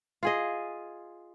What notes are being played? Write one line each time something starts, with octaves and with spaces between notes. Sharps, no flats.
F4 G#4 D#5